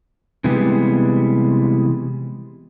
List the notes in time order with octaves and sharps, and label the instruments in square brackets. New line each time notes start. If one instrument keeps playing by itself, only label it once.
[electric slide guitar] C3 E3 G3 G#3 B3